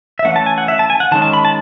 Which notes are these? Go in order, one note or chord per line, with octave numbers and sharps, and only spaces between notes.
E5
E3 A3 C#4 F#5
A5
G#5
F#5
E5
A5
G#5
F#5
D#3 G#3 C#4 A5
A5
B5
A5